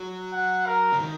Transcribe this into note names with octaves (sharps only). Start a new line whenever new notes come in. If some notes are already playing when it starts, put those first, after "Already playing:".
Already playing: F#3
F#5
A#4
C#3
D#3